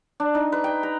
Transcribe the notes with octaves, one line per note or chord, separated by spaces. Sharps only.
D4
D#4
B4
G5
A#5